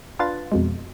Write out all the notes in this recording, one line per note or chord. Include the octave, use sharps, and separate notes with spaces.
D4 F4 B4 F5 A6
F2 B2 G#3